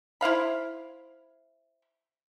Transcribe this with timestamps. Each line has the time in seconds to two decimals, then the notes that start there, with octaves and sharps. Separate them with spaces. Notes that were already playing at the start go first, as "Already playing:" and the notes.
0.21 E4 C5 F5 B5